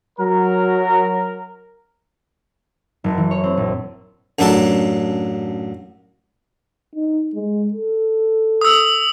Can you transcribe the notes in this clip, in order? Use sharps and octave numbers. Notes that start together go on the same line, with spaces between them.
F#3 A#4
F#1
E3
C#5
C4
A#1
A1 F#2 F#3 D4 A4 A5
D#4
G#3
A4
D#6 E6